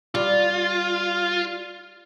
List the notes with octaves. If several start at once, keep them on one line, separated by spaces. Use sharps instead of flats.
G3 F4